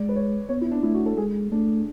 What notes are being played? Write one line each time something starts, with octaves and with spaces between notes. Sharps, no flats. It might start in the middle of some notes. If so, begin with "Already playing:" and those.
Already playing: G#3 D5
B4
C#5
B3 C#5
E4
D4
A3 E4
F#4
A4
G#3 G#4
A3 D4